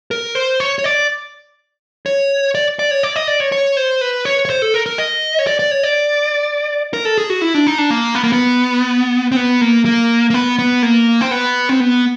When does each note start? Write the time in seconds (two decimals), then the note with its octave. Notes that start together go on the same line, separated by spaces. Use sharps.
0.11 A#4
0.35 C5
0.60 C#5
0.79 C#5
0.84 D5
2.06 C#5
2.55 D5
2.79 D5
2.91 C#5
3.03 D5
3.16 D#5
3.28 D5
3.40 C#5
3.52 C#5
3.77 C5
4.01 B4
4.25 C#5
4.45 C#5
4.50 C5
4.62 A4
4.74 A#4
4.86 A#4
4.98 D#5
5.39 C#5
5.47 D5
5.59 D5
5.71 C#5
5.83 D5
6.93 A#4
7.05 A4
7.18 G#4
7.30 F#4
7.42 E4
7.54 D4
7.67 D#4
7.78 D4
7.90 A#3
8.15 B3
8.24 A#3
8.32 B3
9.32 C4
9.36 B3
9.61 A#3
9.85 A#3
10.30 A#3
10.34 B3
10.59 B3
10.83 A#3
11.21 C4
11.31 B3
11.69 C4
11.80 B3